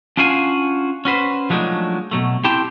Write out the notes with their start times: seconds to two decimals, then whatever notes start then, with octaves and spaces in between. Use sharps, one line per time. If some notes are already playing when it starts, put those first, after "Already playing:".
0.17 C#4 D4 F4 F#4 F5 G#5
1.05 C#4 F#4 B4 C5
1.50 F3 F#3 G#3 A3 D4 D#4
2.11 B2 F#3 A3
2.44 C4 E4 G4 G5 A5 C6